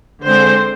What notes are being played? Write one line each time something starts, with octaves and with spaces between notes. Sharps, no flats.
D3 G#3 C4 C5